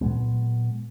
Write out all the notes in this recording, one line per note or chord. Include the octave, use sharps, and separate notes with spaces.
A#2 F#3 G#3 B3